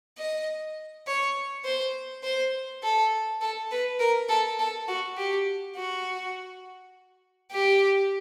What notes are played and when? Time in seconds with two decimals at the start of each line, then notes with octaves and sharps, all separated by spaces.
0.18 D#5
1.07 C#5
1.64 C5
2.23 C5
2.83 A4
3.41 A4
3.71 B4
3.99 A#4
4.29 A4
4.59 A4
4.88 F#4
5.17 G4
5.76 F#4
7.51 G4